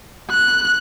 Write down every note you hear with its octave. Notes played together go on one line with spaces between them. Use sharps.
F#6